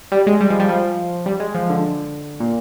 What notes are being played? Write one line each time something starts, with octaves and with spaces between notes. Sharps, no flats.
G3
G#3
G3
F3
G3
F3
G3
G#3
F3
D3
A#2